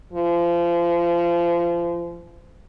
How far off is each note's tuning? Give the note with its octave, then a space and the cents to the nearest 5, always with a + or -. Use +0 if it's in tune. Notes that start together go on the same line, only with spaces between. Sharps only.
F3 -30